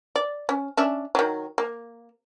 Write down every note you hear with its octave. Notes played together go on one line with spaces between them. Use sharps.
D5
C#4
C#4 D4 E5
D#3 F#3
A#3